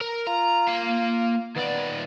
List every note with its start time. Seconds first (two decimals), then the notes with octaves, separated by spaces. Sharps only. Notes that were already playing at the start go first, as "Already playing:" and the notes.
0.01 A#4
0.27 F4 A#5
0.68 A#3 F5
1.56 D#2 B3 D5